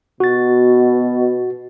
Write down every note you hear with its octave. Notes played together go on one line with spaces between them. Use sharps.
B2 F#4 A6